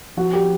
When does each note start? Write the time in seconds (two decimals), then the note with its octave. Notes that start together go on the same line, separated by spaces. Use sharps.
0.17 F3 F#4
0.33 G4